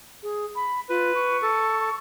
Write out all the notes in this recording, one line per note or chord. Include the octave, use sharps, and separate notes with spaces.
G#4
B5
F4 B4
C#6
A4